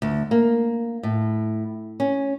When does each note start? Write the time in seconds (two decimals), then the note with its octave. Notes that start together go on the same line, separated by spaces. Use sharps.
0.02 D2
0.31 A#3
1.03 A2
2.00 C#4